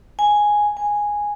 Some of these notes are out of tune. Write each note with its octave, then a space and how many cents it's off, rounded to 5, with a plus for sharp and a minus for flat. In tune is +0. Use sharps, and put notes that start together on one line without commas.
G#5 +0
G#5 -5